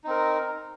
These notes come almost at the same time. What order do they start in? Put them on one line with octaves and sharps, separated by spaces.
D#4 C4 A#4